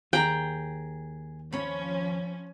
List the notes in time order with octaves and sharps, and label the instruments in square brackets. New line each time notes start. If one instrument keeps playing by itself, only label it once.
[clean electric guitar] D#2 [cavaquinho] G#4 A#5 [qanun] G5
[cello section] F3 C#4 [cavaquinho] C#5 B5